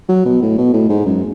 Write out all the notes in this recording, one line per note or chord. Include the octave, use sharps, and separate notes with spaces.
F#3
B2
A2
B2
A2
G#2
F#2